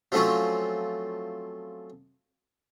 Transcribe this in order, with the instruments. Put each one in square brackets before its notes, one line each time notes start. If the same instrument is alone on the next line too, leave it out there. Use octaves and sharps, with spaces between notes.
[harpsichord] F3 F#3 A3 C4 C#4 F4